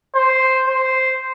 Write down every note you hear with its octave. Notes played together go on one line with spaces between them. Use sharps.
C5
C5